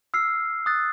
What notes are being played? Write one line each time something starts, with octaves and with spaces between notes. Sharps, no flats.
E6 F6 C7
D#6 F#6 A6